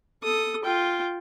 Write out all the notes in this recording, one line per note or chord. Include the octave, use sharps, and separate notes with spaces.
A4 D#6
F4 G5